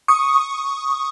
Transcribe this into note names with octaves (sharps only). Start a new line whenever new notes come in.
C#6 D#6